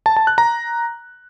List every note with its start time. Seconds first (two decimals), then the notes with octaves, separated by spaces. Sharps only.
0.06 A5
0.17 A5
0.27 F#6
0.38 A#5